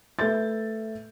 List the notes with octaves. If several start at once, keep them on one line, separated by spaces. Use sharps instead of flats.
A3 A4 B4 E5 G6 A6